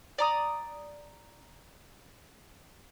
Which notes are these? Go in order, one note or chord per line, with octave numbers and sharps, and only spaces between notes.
D5 A#5 D#6